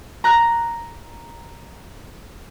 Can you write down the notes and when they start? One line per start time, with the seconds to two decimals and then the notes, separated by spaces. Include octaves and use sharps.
0.24 A#5 F#6